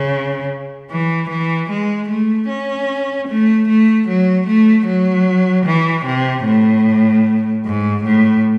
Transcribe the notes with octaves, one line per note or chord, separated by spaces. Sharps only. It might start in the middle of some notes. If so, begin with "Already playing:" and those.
Already playing: C#3
E3
E3
G#3
A3
C#4
A3
A3
F#3
A3
F#3
E3
C3
A2
G#2
A2